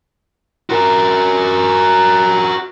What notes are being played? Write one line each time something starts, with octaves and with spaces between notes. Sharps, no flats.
F#4 A#4